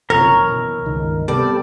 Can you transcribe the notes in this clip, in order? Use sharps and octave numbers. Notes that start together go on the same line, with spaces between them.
F#1 C3 F3 A#4 C#5 A#5
B2 E3
G1 C#2 D#3
C3 G3 A3 B3 G4 A4 D5